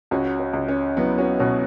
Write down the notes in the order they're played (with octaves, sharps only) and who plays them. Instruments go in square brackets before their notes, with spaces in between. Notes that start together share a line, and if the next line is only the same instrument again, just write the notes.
[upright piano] C#2 [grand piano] C#4 F#4
[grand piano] C#4
[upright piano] C#2
[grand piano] C#4
[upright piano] F#3 [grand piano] B3 E4
[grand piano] C#4 F#4
[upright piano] B2 [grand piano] C#4 F#4